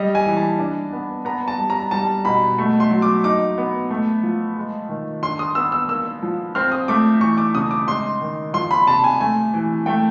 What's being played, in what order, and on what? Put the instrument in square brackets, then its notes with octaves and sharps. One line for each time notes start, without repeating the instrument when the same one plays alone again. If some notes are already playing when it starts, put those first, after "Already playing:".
Already playing: [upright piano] G3 [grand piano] D#5
[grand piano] G#5
[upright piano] E3
[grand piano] A5
[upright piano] D4
B3
[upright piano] B3 [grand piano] A#5
[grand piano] A5
[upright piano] G3
[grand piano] A#5
[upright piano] G3 [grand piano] A5
[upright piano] B2 [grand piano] B5
[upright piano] A3
[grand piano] C6
[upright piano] F#3
[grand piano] D6
[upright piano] D#4 [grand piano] D6
[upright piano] B3
A3
F3
G#3
D#3
[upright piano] D4 [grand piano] C6
[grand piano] D#6
[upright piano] B3 [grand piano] E6
[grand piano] E6
[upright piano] A#3 [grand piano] E6
[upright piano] F3
[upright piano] C4 [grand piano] F6
[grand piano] D#6
[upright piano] A3 [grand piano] D6
[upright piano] E3 [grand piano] C#6
[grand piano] D6
[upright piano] C#3 [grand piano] D#6
[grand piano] D6
[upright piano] G#3 [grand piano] C6
[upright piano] D#3
[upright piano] F3 [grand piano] C6
[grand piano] B5
[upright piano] C3 [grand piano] A5
[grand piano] G#5
[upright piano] A3 [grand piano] G#5
[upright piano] E3
[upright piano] A3 [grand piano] G5